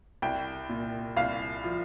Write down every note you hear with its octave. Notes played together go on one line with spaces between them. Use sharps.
C2 G5
A#2
C2 F5
F3